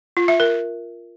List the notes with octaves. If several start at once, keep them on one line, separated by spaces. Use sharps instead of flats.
F4
E5
A#4